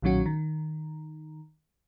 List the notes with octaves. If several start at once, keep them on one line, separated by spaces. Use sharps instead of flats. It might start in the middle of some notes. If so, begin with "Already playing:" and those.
B1 A#2 D#3 F#3 C#4 F#4
D#3